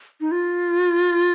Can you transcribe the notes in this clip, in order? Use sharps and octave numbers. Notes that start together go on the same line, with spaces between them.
D#4
F4